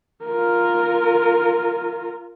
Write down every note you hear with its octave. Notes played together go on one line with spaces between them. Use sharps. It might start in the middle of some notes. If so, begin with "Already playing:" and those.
F4 A#4